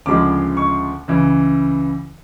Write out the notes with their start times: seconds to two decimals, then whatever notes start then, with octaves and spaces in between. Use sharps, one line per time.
0.06 D2 C#3 F3 G#3 D6
0.57 C#6
1.08 C#2 C#3 E3